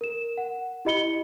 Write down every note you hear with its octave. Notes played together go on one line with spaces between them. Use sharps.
A#4 E7
F#5
E4 G4 D#5 B5 C#7 G7